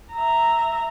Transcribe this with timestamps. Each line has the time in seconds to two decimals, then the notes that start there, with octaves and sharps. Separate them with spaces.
0.13 E5 A#5